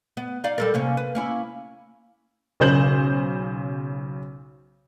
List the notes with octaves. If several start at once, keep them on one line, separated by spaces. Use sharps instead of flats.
B3
D#4 D5 F5
G3 A4 A#4
C3 A#3 C#4
B4
A#3 C#4 E4
B1 C#3 C5 G6 F#7